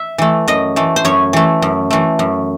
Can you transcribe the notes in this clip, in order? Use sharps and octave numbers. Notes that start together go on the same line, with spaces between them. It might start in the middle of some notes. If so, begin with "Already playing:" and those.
Already playing: E5
E3 A3
F#2 D#5
E3 A3
C5
F#2 C#5
E3 A3
F#2
E3 A3
F#2